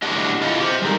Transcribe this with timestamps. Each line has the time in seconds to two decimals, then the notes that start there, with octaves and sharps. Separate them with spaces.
0.02 A2 D4 F#4 G4 D#5
0.41 E4 F4 A4 D#5
0.60 G4 C5
0.82 G3 G#3 D#4 A4 A#4